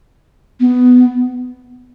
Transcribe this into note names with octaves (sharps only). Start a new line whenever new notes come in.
B3